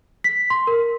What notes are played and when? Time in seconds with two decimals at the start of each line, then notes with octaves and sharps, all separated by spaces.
0.24 B6
0.50 C6
0.67 A#4